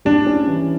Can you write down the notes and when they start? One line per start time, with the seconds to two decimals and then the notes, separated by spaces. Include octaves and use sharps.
0.05 G3 D4
0.26 C#4
0.48 E3